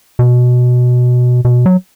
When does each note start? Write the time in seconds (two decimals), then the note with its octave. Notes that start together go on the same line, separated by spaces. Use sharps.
0.19 B2
1.45 B2
1.66 F#3